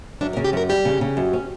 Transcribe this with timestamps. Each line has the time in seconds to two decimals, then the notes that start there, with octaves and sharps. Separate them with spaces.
0.21 F#2 D4
0.33 A#4
0.37 C#3
0.45 G4
0.53 F#2 A#4
0.69 G3 G4
0.85 C#3
1.01 C#3
1.17 F#2
1.33 C#4